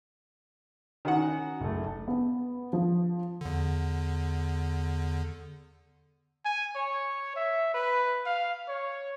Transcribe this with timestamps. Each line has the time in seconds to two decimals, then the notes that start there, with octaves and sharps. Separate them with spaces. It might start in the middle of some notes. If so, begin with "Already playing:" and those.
1.05 D#3 C#4 F#4 F#5
1.61 F#1 A3
2.08 B3
2.73 F3
3.41 E2 D3
6.45 G#5
6.76 C#5
7.36 E5
7.74 B4
8.26 F5
8.69 C#5